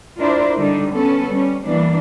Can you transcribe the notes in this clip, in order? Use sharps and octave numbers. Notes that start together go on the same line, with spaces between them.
D4 E4 F4 A#4 C5 D5
D3 G3 D4 D#4
B3 C#4 A4
G3 C#4
E3 G3 A#3 B3 D4